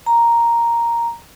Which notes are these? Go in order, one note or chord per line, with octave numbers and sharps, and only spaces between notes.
A#5